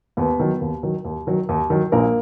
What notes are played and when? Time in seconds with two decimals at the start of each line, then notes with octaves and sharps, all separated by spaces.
0.17 D#2 B3 B4
0.39 D#3 F#3
0.61 D#2
0.83 D#3 F#3
1.05 D#2
1.27 D#3 F#3
1.49 D#2
1.70 D#3 F#3
1.92 A#1 A#3 A#4